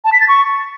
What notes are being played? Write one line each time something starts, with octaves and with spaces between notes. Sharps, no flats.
A5
B6
A6
C#6